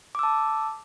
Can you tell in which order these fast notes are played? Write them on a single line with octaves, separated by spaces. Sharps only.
D6 E6 A5